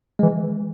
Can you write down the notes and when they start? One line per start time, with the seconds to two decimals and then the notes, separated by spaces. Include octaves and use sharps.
0.19 G#3
0.23 E3